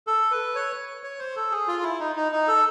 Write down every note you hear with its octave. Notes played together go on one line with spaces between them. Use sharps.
A4
B4
C#5
C#5
C5
A4
G#4
F4
E4
D#4
D#4
D#4
A4